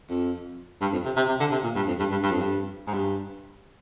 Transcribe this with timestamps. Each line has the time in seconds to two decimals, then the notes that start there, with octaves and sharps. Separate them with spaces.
0.10 F2
0.81 G2
0.92 F2
1.05 C3
1.16 C3
1.28 C3
1.40 D3
1.51 C3
1.63 A#2
1.76 G2
1.87 F2
1.99 G2
2.11 G2
2.23 G2
2.31 F2
2.40 G2
2.87 G#2
2.93 G2